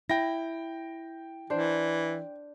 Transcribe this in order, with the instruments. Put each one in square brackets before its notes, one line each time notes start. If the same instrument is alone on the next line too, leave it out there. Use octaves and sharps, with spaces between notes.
[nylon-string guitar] E4 [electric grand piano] G5 A#6
[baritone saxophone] E3 [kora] D4 C5